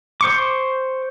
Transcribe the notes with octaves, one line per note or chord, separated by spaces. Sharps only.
C5 C#6 D6